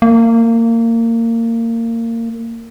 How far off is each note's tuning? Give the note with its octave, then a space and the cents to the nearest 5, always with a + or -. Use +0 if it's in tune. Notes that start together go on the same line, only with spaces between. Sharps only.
A#3 -25